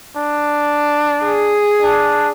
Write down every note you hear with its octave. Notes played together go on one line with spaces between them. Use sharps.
D4
G#4
D4